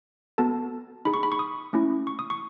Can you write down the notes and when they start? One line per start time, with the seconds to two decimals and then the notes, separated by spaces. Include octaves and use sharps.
0.38 B3 F#4 A4 A5
1.05 D#4 G#4 B5
1.14 C#6
1.23 B5
1.32 C#6
1.39 D#6
1.73 A3 C#4 E4
2.07 C#6
2.19 D#6
2.30 C#6